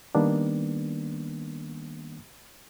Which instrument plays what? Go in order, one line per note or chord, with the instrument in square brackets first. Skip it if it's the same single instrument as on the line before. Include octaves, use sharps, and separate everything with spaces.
[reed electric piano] D#3 G3 A#3 B3 D4